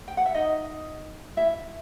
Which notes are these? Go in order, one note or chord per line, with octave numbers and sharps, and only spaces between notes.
G5
F#5
E5
D#4 D#5
E4 E5